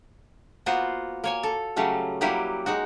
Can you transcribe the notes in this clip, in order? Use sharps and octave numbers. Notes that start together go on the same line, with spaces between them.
A#3 B3 F4 F#4 C5
A#3 C#5 G#5
A4
C#3 F#3 G3 A3 C#4
F#3 G3 A#3 E4 F#4 G4
G#3 D#4 F#4